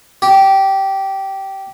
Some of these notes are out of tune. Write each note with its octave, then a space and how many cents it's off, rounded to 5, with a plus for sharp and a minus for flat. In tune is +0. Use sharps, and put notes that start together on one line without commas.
G4 -15